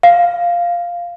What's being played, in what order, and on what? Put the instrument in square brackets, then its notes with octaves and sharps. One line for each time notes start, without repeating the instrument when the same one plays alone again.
[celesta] F5